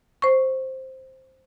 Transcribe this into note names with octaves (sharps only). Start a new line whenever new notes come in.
C5 C#6